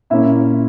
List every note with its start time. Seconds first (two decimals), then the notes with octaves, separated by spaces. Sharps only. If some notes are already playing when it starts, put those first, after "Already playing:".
0.10 A#2 A#3 C#4 E4 E5